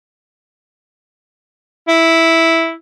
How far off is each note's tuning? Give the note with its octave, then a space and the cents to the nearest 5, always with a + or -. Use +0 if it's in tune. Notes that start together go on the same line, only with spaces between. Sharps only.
E4 -5